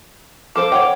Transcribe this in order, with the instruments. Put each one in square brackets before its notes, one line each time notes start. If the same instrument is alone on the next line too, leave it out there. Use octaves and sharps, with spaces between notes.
[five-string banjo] F3 A4 C5 [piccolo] D6
[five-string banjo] C#5 F#5 G5